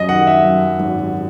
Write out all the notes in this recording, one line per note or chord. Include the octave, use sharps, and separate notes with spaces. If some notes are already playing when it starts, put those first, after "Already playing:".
Already playing: F#2 D#5
D#3 F#5
E5
F#2
G#1